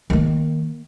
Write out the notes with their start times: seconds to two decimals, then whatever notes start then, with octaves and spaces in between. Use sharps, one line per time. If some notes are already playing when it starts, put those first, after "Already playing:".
0.10 D#3 A#3